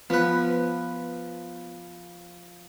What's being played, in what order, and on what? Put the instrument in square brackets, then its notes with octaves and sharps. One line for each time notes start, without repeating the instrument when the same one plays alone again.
[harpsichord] F3 B4 [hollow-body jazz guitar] B3